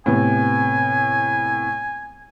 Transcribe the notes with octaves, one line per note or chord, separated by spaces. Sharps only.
A2 C3 B3 G#5